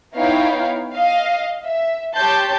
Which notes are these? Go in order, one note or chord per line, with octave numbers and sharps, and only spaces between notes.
B3 D#4 E4 C#5 F5 G5
D#5 F5
E5
G4 C#5 G5 A5 C6 G6